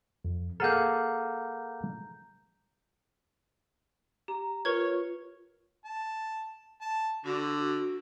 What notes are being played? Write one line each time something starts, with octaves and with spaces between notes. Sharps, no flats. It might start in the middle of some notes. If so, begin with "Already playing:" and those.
F2
A#3 G#4 A4 F5 F#5 A#5 F6 G6
G4 A#5
F4 A#4 B4 C#5 G#6
A5
A5
D3 F#4